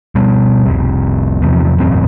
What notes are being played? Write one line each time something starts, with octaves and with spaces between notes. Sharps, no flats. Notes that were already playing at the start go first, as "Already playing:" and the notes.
B2 G3 B3
F1 C2 C3
E2 C3 F3
E1 A1 F#2 C4